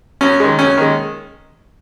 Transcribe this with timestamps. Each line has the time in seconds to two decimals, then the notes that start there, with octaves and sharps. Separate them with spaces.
0.21 F#2 C#4
0.40 D#3 G#3
0.59 F#2 C#4
0.78 D#3 G#3